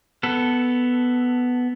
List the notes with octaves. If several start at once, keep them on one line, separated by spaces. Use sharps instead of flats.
B3 A4